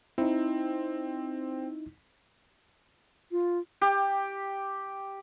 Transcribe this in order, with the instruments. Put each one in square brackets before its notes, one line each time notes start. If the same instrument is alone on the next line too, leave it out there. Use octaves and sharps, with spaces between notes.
[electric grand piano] C4 [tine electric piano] D#4 E4
[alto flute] F4
[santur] G4